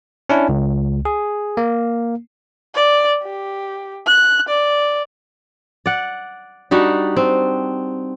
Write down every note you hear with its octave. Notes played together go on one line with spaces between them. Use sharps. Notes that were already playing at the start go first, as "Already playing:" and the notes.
C#4 D4 E4
C#2
G#4
A#3
D5
G4
F#6
D5
D5 F#5
G3 D4 D#4 F#4
C4